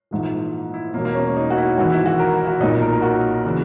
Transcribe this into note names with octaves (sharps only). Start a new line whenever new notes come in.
A#1 G#2 E3
E4
E1 E2 B2 A#3
A#3
C#4
C#4
D#4
F#4
E4
G#1 G#2 E3 F#4
E4
F#4
A#4
F#4
B1 A#2 D#4
A#4
A#4
F#4
C#3 E3